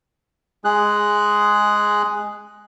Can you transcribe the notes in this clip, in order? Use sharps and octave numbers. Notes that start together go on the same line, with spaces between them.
G#3 G#4 F#6